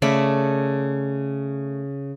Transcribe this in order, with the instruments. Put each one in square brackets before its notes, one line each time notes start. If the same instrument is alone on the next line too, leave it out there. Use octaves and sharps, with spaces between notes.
[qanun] C#3 A3 D5 B5